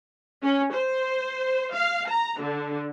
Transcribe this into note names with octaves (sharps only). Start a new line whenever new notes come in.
C#4
C5
F5
A#5
D3